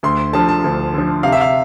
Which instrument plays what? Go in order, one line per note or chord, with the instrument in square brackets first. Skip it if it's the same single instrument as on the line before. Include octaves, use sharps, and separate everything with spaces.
[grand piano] D2 [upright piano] C6
[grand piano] D3 F3 [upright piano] A5
[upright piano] A5
[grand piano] D2
D3 F3
[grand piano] C3 [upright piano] F5
[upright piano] E5
F5